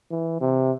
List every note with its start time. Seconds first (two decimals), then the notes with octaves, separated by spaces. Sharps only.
0.11 E3
0.41 C3